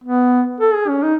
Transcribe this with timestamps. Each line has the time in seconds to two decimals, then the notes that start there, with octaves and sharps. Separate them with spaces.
0.04 B3
0.60 A4
0.74 G#4
0.88 C#4
1.03 D#4